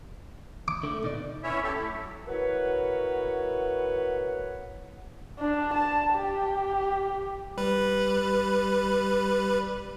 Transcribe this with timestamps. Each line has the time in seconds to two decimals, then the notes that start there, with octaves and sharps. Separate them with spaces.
0.68 D6
0.83 D3 A3
1.04 B2 D#4 D5
1.43 B3 C#4 E4 C#5 E5
1.63 G4 A4
1.74 A3 E4
1.91 F#3
2.27 E4 F#4 A#4 B4 C#5 F#5
5.39 D4
5.73 A5
6.13 G4
7.57 G3 B4